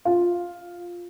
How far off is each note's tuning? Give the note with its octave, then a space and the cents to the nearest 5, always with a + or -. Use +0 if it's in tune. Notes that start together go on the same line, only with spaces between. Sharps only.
F4 +5